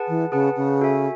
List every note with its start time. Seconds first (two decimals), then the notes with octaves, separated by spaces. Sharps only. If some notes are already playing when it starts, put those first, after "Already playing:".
Already playing: G#4 B4 F#5 A5
0.08 E3
0.32 C#3 G#4 B4 F#5 A5
0.56 C#3
0.81 F#4 A4 E5 G#5